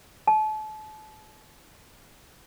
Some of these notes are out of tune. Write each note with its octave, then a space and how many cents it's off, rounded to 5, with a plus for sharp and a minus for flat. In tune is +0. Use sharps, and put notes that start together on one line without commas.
A5 -35